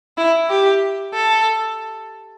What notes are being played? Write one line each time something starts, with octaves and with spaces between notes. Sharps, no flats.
E4
G4
A4